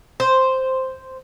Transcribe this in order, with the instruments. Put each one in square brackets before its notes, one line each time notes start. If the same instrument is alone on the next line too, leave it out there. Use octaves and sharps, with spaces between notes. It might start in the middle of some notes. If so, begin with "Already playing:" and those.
[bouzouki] C5